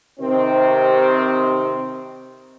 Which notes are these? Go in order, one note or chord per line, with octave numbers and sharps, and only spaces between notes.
C3 D#3 C4